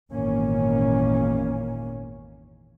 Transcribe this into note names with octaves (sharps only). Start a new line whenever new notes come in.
G#1 E2 A#2 D#3 A#3 C#4